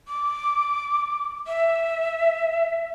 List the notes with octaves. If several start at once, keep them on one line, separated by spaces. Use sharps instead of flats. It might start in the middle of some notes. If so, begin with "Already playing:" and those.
D6
E5